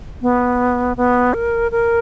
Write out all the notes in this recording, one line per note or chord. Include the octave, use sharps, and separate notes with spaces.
B3
B3
A#4
A#4